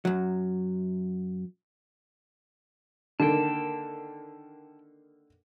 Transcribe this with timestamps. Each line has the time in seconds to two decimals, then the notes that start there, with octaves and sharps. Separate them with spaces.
0.05 F#2 F#3
3.20 D3 D#3 A#3 G5 A5